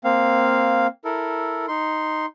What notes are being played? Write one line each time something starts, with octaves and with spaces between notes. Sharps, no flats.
A#3 C4 F5
E4 A4 A#4
D#4 C6